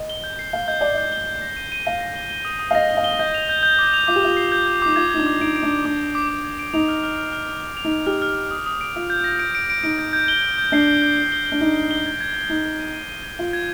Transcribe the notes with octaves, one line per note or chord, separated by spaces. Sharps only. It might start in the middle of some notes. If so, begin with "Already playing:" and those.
Already playing: D#5
G7
G6
C7
F5 G6
D#5 G6
D5 G7
D#5 G6
G7
G6
A#6
D#7
D#7
F5 A#6
A#6
G7
G7
D#6
D#6
F5
D#5 A#6
G7
F5
G7
D#5 G6
F7
G6
G6
D6
F7
F4 D6
G4
F4 G6
C7
G6
G6
D#4 D6
F4 G#6
D#4 G#6
D4
D6
D#4 D7
D7
D4
D7
D4 D6
G#6
D6
D6
G#6
D7
D#4 F7
F6
F6
F6
F6
F7
F6
F7
D#4
F6
G4 F6
F6
F6
D#6
D#6
D7
F4 D#6
G6
A#6
D7
D7
D7
D#4 D7
G6
G6
G7
G6
G6
D4 C7
G6
G6
G7
G7
G7
D4
D#4 G7
G7
G7
G#6
G#6
G#6
D#4 G7
G#6
D#7
D#7
D#7
G#6
F4 G7
G#6